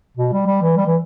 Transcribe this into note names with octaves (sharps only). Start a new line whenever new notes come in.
B2
G3
G3
E3
G3
E3